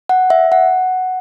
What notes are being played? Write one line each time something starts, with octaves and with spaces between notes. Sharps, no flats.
F#5
E5
F#5